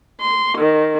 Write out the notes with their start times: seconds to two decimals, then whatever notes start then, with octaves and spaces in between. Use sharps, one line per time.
0.21 C6
0.58 D#3